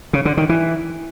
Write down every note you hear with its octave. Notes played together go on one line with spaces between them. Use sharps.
C#3
D3
D#3
E3